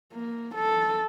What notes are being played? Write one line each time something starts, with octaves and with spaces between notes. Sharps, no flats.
A#3
A4